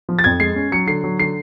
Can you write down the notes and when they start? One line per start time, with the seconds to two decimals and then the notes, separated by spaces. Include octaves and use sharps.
0.09 F3
0.19 A6
0.24 F2 G#6
0.40 G#3 C7
0.56 C#4
0.72 F#3 C#7
0.87 D3 C7
1.04 F#3
1.19 D3 C7